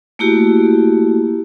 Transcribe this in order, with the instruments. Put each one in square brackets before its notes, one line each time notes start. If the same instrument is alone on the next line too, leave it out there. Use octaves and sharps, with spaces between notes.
[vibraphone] A3 A#3 E4 F#4 G4